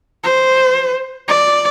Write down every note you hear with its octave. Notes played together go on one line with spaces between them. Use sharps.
C5
D5